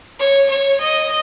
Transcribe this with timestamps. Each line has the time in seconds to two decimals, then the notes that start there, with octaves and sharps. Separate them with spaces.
0.19 C#5
0.51 C#5
0.81 D#5